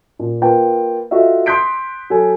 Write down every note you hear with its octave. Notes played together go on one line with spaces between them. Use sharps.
A#2
A#3 F4 B4 G5
F4 F#4 A4 D#5 E5
C6 D#6 F#6 G6 B6 D7
F#3 A4 G#5